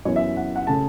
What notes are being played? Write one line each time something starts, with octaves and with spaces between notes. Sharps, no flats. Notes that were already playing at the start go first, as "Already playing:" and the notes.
F#2 E3 B3 C#5
E5
F#5
F#5
C#3 A3 A5